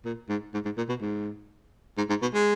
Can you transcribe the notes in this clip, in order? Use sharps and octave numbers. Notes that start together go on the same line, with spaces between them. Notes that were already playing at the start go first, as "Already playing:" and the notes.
A#2
G#2
G#2
G#2
A#2
B2
G#2
G#2
G#2
B2
G#3